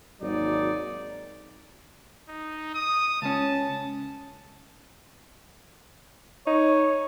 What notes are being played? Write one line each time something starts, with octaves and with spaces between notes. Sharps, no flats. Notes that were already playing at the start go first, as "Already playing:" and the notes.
G#1 D#2 G#2 F#3 D#4 D5
D#4
D#6
C#2 C#4 A5
D#4 C#5